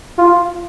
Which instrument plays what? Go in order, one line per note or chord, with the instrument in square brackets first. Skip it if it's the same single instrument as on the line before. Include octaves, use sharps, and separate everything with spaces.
[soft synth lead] F4